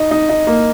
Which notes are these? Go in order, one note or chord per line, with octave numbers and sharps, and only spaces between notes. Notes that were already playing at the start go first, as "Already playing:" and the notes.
Already playing: D#4
D#4
D#4
A#3